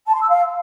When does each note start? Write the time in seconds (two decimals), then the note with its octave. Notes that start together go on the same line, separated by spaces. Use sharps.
0.07 A5
0.14 C6
0.22 E6
0.30 F5